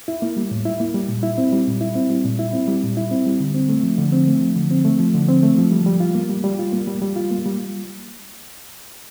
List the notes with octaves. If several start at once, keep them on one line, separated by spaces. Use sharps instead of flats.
E4
A#3
G3
A2
E4
A#3
G3
A#2
E4
C4
G3
A#2
E4
C4
G3
A#2
E4
C4
G3
A#2
E4
C4
G3
D3
C4
A3
F3
D3
C4
A3
F3
D3
C4
A3
F3
D3
C4
A3
F3
G3
G3
F4
A#3
G3
G3
F4
A#3
G3
G3
F4
A#3
G3